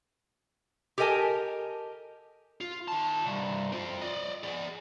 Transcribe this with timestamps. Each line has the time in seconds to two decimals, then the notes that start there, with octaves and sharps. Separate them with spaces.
0.98 G4 A4 A#4 D#5 G#5 A5
2.61 F4
2.88 D#3 A5
3.26 C2 G2
3.72 C4 F4
4.02 D5 D#5
4.43 G#4 D5